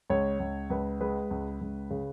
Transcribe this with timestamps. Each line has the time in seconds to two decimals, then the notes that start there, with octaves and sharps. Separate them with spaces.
0.10 C#2 C#5
0.40 C#2
0.70 C#2 B4
1.01 G#3 B4
1.31 C#2
1.61 C#2
1.90 C#3